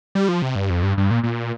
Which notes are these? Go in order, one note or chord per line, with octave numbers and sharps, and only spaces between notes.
G3
F3
C3
G2
F2
G2
G2
A#2
A#2